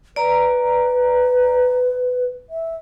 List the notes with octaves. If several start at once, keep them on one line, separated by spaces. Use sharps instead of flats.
B4 D5 A#5
E5